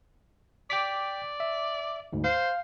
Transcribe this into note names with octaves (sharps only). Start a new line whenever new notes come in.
D5 G5 D6 B6
E5
D2 G#2
C5 F5